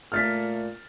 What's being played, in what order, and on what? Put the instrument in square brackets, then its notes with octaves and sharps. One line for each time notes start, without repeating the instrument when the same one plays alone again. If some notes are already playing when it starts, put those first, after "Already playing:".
[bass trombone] A#2 [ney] A3 [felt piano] F6 A6 B6